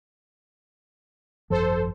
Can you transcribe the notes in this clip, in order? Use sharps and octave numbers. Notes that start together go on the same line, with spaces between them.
G#1 F#2 F3 A4 C5